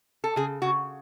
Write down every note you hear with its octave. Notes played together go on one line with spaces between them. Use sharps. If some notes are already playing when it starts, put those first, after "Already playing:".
A4
C#3 G#4
C#3 F#4